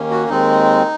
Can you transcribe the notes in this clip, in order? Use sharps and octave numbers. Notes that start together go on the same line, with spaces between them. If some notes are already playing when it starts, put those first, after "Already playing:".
Already playing: D#2 D#3 A#3 C#4
F#4
D#2 D#3 G#3 C4 D#4